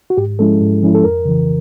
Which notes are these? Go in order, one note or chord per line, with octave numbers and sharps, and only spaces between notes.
F#4
G#2 G4
F3 G#3 C#4 E4 A4
G#2
F3 G#3 C#4 E4
A4
F2 A#4
C#3 E3